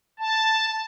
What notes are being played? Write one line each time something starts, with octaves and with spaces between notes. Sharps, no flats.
A5